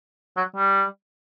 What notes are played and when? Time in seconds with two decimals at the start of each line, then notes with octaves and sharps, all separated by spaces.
0.37 F#3
0.56 G3